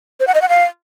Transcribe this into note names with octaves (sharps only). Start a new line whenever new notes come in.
C5
F#5
D#5
F#5
F5